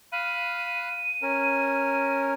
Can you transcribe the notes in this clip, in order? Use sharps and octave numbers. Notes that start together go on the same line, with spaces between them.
F5 B5 F#6 D#7
C#4 A#4